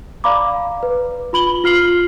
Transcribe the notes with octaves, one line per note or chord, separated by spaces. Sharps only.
D5 F5 A#5 B5 D6
B4
F4 B5 F#7 G7
F4 F6 C7 F#7